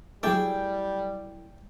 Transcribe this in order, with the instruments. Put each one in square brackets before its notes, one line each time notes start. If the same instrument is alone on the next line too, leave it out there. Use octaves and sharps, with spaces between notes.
[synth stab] F#3 A3 [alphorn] G3 [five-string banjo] E4 G#4 [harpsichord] D5 G5